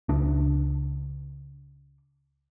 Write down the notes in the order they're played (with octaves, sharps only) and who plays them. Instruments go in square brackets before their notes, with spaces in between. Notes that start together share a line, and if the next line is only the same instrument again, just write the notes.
[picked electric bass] C#2 D4